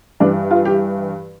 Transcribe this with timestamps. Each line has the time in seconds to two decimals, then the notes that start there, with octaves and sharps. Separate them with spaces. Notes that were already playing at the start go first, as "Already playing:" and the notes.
0.20 G2 E3 D4
0.51 F4
0.65 G4